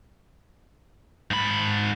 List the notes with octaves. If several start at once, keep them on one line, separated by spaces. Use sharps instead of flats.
G#2 B5